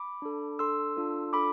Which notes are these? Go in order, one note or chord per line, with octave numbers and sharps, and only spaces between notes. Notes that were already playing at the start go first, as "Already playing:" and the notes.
Already playing: B5 D6
D4 A4
D4 A4 C6 E6
D4 F4 A4
D4 F4 A4 B5 D6